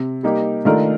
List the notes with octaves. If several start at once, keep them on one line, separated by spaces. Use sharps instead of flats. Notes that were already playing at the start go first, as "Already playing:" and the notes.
Already playing: C3
G3 A#3 D#4 G4
D#3 A3 D4 F4 A#4